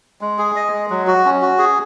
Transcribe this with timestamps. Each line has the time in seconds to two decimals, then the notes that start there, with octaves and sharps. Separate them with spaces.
0.21 G#3
0.38 G#4
0.56 D#5
0.73 G#3
0.90 F#3
1.07 F#4
1.25 C#4
1.42 F#4
1.58 G#4